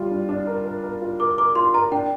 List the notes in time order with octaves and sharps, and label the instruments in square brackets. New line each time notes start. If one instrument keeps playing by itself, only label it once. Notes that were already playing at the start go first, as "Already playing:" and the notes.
Already playing: [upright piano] G3 F4
D4
D4
A#4
A#4
A#4
F4
[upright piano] A#4 [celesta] D6
[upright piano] A#4 [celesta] D6
[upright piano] F4 [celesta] C6
[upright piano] A#4 [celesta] A#5
[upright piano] D4 [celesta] G5